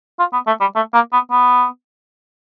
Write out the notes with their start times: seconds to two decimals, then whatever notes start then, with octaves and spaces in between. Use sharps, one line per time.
0.19 F4
0.33 B3
0.47 A3
0.61 G3
0.76 A3
0.94 A#3
1.13 B3
1.31 B3